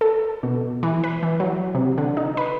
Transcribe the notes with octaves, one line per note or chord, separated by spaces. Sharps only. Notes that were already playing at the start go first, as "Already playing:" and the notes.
A4
B2
E3
B4
E3
F#3
C3
D3
D#4
B4